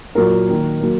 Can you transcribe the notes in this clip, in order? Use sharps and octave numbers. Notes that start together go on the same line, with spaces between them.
A#2 F#3 A#3 A#4
D#3 A#3
F#3 A#3